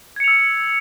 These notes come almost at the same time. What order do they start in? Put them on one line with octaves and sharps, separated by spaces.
G#6 C#7 F7 E6